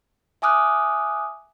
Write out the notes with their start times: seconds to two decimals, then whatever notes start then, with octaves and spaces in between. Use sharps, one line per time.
0.42 E5 G#5 D6 D#6 F6 F#6